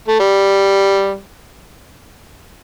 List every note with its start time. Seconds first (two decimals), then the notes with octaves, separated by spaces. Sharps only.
0.08 A3
0.19 G3